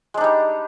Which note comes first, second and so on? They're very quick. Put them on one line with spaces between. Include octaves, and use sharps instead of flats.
G#3 D4 D#4 G3